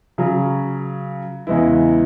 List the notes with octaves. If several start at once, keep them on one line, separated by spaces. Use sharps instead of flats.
C#3 F#3 C#4
E2 C#3 G#3 B3 E4